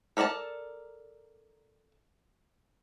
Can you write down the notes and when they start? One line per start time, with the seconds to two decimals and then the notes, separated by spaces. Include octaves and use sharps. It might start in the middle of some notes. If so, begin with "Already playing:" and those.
0.17 A4 A#4 D5 D#5 A5